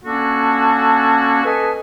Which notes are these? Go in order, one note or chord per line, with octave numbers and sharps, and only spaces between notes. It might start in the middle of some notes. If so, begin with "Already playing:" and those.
A#3 C#4 D4 F#4 A4
A4 B4 D#5 G#5 A5